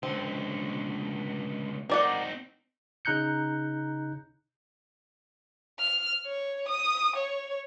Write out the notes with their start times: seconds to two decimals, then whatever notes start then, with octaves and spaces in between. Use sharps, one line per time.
0.03 C#2 D3 C4
1.90 C4 D#4 A#4 D5 F#5
3.05 C#3 D#4 A#5 F#6 G6 C#7
5.79 F6
6.26 C#5
6.68 D#6
7.16 C#5